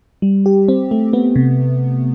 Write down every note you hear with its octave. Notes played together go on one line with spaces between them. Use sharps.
G3
G4
C4
A3
B3
C3